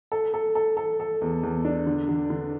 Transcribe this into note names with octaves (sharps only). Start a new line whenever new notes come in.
A4
A4
A4
A4
A4
E2
E2
D4
D3
D3
D3